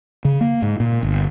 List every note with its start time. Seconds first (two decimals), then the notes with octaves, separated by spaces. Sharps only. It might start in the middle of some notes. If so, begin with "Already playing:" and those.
0.25 C#3
0.41 A#3
0.62 G#2
0.80 A#2
1.03 G1